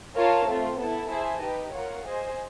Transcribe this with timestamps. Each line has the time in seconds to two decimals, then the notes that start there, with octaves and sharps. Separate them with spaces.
0.16 F4 A#4 C#5 F5 A5
0.48 A3 C4 F4
0.79 B3 E4 A4
1.11 E4 G#4 C5 E5 A5
1.42 D#4 G4 B4 D#5
1.74 F4 A#4 C#5 F#5
2.05 G#4 C5 D#5